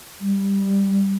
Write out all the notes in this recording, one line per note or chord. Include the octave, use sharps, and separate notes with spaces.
G3